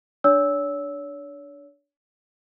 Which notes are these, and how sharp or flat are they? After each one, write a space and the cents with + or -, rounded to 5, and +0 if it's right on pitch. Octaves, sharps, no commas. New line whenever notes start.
D4 +0 C#5 +35 E6 -10